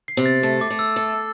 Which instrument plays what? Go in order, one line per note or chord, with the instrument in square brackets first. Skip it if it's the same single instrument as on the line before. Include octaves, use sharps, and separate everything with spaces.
[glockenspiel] C7
[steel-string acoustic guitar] C3
[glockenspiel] A6
[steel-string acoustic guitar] A3
[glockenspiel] D6
[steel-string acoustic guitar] A3
[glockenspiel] E6
[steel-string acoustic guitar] A4